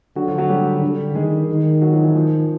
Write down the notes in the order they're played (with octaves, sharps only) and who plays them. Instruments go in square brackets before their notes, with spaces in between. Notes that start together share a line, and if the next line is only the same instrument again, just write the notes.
[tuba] D3 [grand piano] F#3 F#4
[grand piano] F3 F4
F#3 F#4
G3 G4
[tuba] D3
[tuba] D#3 [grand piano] G#3 G#4
[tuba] D#3
[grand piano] F#3 F#4
F3 F4
E3 E4
F3 F4